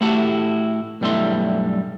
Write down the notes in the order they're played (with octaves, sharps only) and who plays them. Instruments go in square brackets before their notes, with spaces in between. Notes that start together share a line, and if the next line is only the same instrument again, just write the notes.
[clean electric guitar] A2 A3 E4 F#4 G4 A5
B1 G2 G3 A3 E4 C6